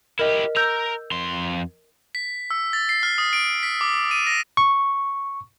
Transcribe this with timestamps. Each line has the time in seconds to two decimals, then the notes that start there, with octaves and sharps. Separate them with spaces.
0.19 E4 G4 A#4 D#5
0.56 A#4 A#5 E6 G6
1.12 F2 C6
2.15 B6
2.51 E6
2.73 A6
2.89 C7
3.03 F6
3.18 D#6
3.33 D7
3.63 B6
3.81 D6
4.11 D#7
4.27 A#6
4.57 C#6